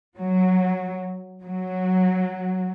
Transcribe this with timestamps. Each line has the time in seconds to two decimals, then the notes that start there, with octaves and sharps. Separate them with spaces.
0.19 F#3
1.43 F#3